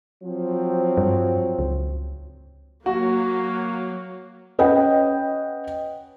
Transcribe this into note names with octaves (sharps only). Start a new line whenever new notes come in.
F3 F#3 C4
G2
C#2
F#3 A#3 F#4
C#4 B4 D#5 F#5 G5